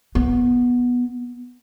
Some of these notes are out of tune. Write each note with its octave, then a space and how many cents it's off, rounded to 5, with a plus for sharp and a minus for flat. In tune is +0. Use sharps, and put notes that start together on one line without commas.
B3 -10